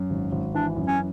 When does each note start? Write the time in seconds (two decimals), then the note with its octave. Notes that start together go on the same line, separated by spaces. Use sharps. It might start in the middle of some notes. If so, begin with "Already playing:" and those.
Already playing: F#2
0.10 G#1
0.32 G#1
0.54 E3 D4
0.77 F#2
0.87 C#4